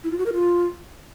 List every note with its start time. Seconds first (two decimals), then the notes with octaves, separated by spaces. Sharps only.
0.04 E4
0.11 F4
0.19 F#4
0.26 A#4
0.33 F4